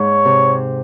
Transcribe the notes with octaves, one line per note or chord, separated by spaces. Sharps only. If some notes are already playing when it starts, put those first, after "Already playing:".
Already playing: G#2 C#5
C3